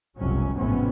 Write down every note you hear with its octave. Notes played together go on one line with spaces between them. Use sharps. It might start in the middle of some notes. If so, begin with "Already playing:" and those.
F1 C2 F2 B2 F#3 C#4
A1 F2 G#2 C3 B3 C#4